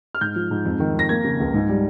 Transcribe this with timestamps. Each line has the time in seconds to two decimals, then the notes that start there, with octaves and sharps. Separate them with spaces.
0.15 F6
0.21 G#2 G6
0.36 F3
0.51 G#2
0.65 F2
0.80 D#3
0.95 F2 A#6
1.09 A#3 G#6
1.24 C#3
1.40 C#2
1.54 G#2
1.69 G3